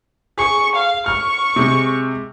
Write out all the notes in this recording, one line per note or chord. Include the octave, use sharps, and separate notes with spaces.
G#4 C#6
F5
C#6 F6
C3 G#3